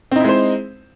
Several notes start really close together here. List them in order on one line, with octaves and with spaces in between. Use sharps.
C4 D#4 E4 G#3 C5